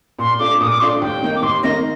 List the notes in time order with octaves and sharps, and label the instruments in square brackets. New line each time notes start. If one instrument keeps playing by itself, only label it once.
[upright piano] A#2 [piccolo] C6
[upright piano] A3 D4 F4 [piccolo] D6
[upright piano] A#2 [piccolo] D#6
[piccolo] D6
[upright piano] A3 D4 F4 [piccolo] C6
[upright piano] D#2 [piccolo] G5
[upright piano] D#3 A#3 D#4
[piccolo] D6
[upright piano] D#2 [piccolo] C6
[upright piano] D#3 A#3 D#4 [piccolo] A#6